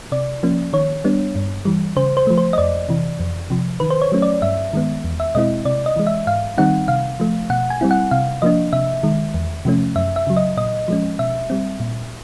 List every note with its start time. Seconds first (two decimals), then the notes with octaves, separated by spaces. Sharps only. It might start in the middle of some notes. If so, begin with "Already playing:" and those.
0.12 C3 D5
0.43 F3 A#3 C#4
0.73 D#3 C#5
1.04 G3 B3 D4
1.35 G2
1.65 E3 G3
1.96 C#3 C5
2.17 C5
2.27 F3 A3
2.38 C5
2.53 D#5
2.58 F2 D5
2.89 C3 E3
3.20 F2
3.50 C3 F3
3.80 D#3 B4
3.90 C5
4.02 C#5
4.12 F#3 A3 C#4
4.22 D5
4.42 G2 E5
4.73 D#3 G#3 B3
5.04 E2
5.20 E5
5.35 B2 G#3 C4 E4 D#5
5.65 C3 D5
5.86 D#5
5.96 E3 G#3
6.07 E5
6.27 G#2 F5
6.58 D#3 G3 C4 D#4 F#5
6.88 C3 F5
7.20 F3 A3
7.50 B2 F#5
7.70 G#5
7.81 G3 C4 E4
7.91 F#5
8.11 C3 F5
8.42 F3 A#3 D4 D#5
8.73 C3 E5
9.03 D#3 G#3
9.34 E2
9.65 C3 F3 A3 C#4
9.96 F#2 E5
10.16 E5
10.27 C#3 F#3
10.37 D#5
10.57 A#2 D#5
10.88 F3 G#3 C#4
11.19 B2 E5
11.50 G3 C4
11.80 A#2